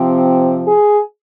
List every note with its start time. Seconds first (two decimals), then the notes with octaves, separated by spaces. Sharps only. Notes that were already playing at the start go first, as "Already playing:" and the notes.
Already playing: C3 F3 C4
0.67 G#4